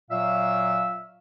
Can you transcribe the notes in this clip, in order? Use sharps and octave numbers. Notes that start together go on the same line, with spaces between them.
A#2 F#3 E5 F5 E6